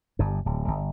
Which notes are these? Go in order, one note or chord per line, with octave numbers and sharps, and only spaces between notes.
G1 G2
D1
G1